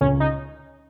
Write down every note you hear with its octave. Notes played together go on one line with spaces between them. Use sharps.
C#2 C#4
D#4